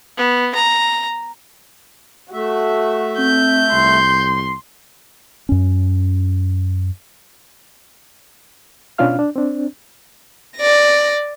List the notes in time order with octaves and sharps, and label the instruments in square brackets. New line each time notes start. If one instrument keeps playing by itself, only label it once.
[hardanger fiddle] B3
A#5
[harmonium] A3 E5 [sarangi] F#4
[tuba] C4 [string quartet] G6
[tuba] C2 [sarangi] C6
[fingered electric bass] F#2 C#4
[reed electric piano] B2 C#4 D4 F4 F5 F6
D4
C4 D4
[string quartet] D5 A#6